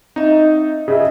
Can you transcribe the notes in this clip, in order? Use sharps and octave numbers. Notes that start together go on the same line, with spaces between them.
C4 D#4 D#5 E5
C#3 G#4 D#5 E5